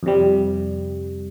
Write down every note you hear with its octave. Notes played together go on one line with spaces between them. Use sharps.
F2 C3 G3